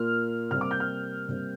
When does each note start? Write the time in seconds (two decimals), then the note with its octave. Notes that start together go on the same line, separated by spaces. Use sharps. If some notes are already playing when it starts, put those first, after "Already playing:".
Already playing: A#2 A#3 F6
0.51 C3 G3 A#3 F6
0.61 D6
0.71 G6
0.80 F6
1.29 C3 G3 A#3